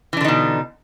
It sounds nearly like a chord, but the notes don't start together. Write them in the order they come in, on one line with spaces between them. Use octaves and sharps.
E3 D4 D3 D#4 B2